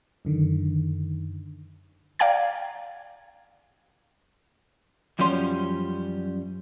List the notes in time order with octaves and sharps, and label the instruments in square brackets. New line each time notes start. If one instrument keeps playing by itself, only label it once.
[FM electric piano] F#2 D3 D#3
[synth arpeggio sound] D5 F5 G5 A#5 G#6
[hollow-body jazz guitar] F#2 F3 G3 C#4 C6